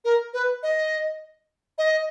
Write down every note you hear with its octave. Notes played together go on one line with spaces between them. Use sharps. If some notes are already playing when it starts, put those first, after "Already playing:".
A#4
B4
D#5
D#5